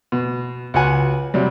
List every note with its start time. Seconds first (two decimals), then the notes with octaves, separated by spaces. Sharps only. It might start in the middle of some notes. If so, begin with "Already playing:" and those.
0.12 B2
0.74 C#2 F#4 F#5 G#5
1.34 C3 F#3 G3